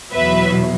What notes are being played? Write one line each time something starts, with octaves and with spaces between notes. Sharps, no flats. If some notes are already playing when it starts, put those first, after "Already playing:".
E2 B2 F#3 B4 E5